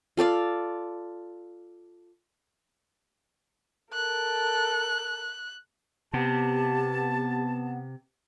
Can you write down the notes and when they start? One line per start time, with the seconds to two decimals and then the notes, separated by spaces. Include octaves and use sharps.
0.17 F4 A4 D5 F5
3.94 A4 A#4 F#6
6.13 C3 B3 G4 A5